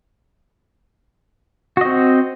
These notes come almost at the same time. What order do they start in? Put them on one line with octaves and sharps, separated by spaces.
F#4 D#5 C4